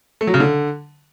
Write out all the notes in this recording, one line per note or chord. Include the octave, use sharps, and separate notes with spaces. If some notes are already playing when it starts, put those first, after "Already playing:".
A3
F#3
C#3
D3